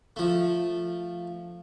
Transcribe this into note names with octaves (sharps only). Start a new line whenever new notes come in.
F3 A3